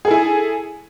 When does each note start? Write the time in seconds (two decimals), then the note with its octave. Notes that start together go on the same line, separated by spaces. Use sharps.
0.05 G#4
0.08 A4
0.11 E4
0.14 G#5